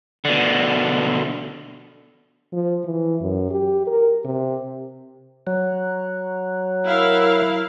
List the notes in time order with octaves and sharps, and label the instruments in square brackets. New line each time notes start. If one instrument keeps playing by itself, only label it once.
[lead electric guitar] B2 D3
[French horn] F3
E3
F#2
G4
A#4
C3
[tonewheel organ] F#3
[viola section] E4 A#4 F5